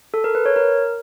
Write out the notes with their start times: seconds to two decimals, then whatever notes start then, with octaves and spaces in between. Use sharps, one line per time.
0.14 A4
0.24 A#4
0.35 B4
0.46 C#5
0.56 A#4